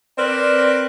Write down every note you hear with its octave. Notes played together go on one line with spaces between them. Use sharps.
C4 A#4 B4 D5